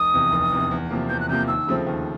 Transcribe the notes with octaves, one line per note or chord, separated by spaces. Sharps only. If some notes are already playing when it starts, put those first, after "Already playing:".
Already playing: F1 D#6
E2 C3
F1
E2 C3
E2
C3 F3 A#3
E2 G6
F#6
C3 F3 A#3 G6
D#2 E6
C#3 F3 A3 C4
D#2